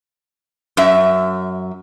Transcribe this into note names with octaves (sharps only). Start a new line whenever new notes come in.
F#2 E5